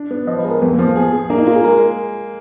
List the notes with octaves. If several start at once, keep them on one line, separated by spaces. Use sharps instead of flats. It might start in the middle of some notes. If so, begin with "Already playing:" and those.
Already playing: D4
B3
F3 D#5
B4
G#3
A#4
F2 B3
A#3
F3
A#3
B3 G#4
G#4
A#3 D4
D#4
A#3 F4
G#4
G#3 A#4